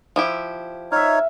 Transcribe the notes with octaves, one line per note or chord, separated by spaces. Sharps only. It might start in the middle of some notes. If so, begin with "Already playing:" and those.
F3 E4 G4
D#4 C#5 E5 F5